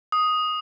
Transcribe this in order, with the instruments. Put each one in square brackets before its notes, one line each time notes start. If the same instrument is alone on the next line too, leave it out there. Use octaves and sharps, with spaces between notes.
[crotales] D#6